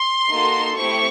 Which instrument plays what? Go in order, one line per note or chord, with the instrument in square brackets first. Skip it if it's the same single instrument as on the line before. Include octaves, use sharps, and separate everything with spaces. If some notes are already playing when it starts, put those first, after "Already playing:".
Already playing: [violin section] C6
A#3 D#4 F#4 A4
A3 C4 E4 G4 C#6